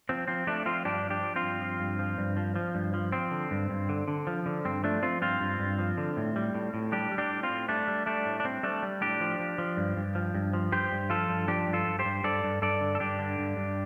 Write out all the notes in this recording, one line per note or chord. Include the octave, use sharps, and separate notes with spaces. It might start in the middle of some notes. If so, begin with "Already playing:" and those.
F3 C4
F3 C4
F3 A3 D4
F3 C4 F4
G2 D4 G4
F3
D4 G4
F3
C4 F4
G2
F3
G2
F3
G2
F3
F3
G2
F3
F3 C4
D3
G2
G2
D3
D3
F3
D3
G2 C4
F3 A3 D4
F3 C4 F4
G2 C4 F4
G2
G2
F3
D3
A2
G3
A2
A2
G3 D4 G4
G3
D4 G4
A2
C4 F4
A2
G3 A3 D4
G3
G3 A3 D4
A2
D4
G3 C4
G3 A3 D4
G3
A2 D4 G4
F3
F3
F3
G2
G2
F3
G2
F3
G2 G4 C5
G2
F3 F4 A4
G2
F3 D4 G4
G2
F4 A4
G2
G4 C5
G2
G2 A4 D5
G2
G2 A4 D5
D3
A4
G2 D4 G4
D3
G2
G2